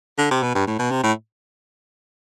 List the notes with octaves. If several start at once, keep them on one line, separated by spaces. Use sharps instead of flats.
D3
C3
B2
G2
A2
B2
C3
A2